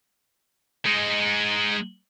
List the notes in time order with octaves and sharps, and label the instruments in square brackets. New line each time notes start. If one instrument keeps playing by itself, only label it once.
[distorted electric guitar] G#3 D#4